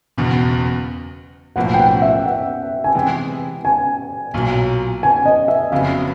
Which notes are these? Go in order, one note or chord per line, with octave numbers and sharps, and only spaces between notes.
F#1 E2 B2
B1 A2 F3 A#3 F#5
G5
F#5
E5
F#5
G#5
C3 E3 G#3 B3 G5
G#5
B1 A#2 F#3
G#5
D#5
E5
F#1 F2 C#3 F#3 B3 F5